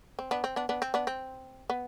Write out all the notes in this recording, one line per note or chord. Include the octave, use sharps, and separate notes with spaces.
C4
B3 D4
C4
B3 D4
B3 D4
C4
B3 D4
C4
B3